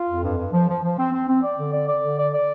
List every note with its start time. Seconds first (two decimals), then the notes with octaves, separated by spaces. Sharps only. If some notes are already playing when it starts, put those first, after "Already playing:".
Already playing: F4
0.08 F2
0.24 G2
0.38 G2
0.53 F3
0.69 F3
0.83 F3
0.98 C4
1.13 C4
1.28 C4
1.42 D5
1.58 D3
1.73 D5
1.88 D5
2.03 D3
2.18 D5
2.34 D5